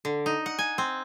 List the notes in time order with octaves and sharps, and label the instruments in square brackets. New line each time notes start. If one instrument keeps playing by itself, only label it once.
[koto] D3
D#4
F#5
G#5
C4